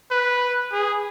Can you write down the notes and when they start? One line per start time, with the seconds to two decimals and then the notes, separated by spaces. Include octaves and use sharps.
0.11 B4
0.72 G#4